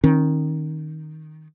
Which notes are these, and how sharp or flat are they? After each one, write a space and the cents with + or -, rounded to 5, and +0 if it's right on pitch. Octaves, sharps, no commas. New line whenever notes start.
D#3 +0 C#4 -40